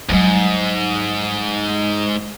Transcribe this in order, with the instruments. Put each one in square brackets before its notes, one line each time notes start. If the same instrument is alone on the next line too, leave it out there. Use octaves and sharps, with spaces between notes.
[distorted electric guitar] D#2 G#2 [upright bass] F#3 G3